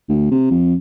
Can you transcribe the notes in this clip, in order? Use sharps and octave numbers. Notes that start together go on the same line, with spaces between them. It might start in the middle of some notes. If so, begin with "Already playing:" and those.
D2
C3
F2